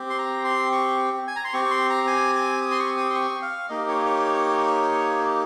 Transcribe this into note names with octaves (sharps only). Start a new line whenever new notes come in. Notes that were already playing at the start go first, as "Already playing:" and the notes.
Already playing: C4 G4
C6
A#5
C6
C#6
G#5
A#5
C6
C4 G4 C#6
C#6
C6
A#5
G#5
G#5
D#6
C6
C#6
D#6
C6
C#6
F5
A#3 D#4 G4 D#5
C#5
C#5